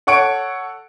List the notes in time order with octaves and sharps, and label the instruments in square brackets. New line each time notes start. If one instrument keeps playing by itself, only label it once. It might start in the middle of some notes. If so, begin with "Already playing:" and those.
[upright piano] A4 C#5 F#5 C#6 C#7 D7